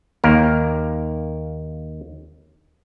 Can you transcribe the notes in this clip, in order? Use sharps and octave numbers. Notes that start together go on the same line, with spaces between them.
D#2 A#3 A#4